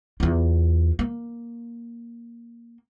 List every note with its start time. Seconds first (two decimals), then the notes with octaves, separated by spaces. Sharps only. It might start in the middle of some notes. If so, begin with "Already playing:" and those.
0.20 E2 F4
0.99 A#3